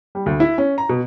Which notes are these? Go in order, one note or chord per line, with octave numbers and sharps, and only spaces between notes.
G3
D2
E4
C#4
A#5
B2